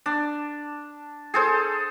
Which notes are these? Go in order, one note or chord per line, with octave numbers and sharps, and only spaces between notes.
D4
G#4 A4 C5